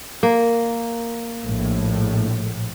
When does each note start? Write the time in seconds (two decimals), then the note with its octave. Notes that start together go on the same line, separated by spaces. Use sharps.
0.23 A#3
1.43 A#1 A2